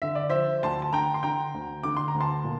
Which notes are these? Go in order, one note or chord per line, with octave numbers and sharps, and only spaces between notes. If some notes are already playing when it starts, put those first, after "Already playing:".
D3 E5
D5
F3 C5 E5
D2 A5 C6
A5
D3 G5 A#5
C6
D3 G5 A#5
D2
D3 D6
C6
A#5
D2
A5 C6
A#2